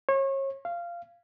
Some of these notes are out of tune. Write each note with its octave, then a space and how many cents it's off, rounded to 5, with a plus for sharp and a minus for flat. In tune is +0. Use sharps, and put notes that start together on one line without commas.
C#5 -35
F5 -15